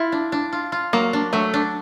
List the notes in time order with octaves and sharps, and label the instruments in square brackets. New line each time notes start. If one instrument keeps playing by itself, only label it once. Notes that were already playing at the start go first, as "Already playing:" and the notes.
Already playing: [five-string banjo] E4 [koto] F4
[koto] D4
D4
F4
F4
[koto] F#3 [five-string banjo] A#3
[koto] D4
[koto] F#3 [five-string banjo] A3
[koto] D4